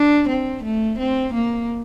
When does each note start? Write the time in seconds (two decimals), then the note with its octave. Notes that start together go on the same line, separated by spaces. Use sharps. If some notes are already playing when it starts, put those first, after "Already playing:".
Already playing: D4
0.28 C4
0.63 A3
0.99 C4
1.34 A#3